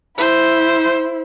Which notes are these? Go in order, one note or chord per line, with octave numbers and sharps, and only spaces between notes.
E4 C5